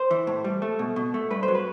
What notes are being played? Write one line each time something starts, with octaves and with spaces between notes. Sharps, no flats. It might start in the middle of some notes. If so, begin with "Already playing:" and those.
Already playing: C5
E3
A2
G3
A3
B2
B2
A3
G2 B4
C5
F#3
B4